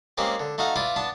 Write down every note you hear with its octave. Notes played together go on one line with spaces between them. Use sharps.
G#3 A#3 C4 C#4 G4
D3
A3 D#4 F#4 F5 F#5
E4 F4 B4 D5
B3 D4 A5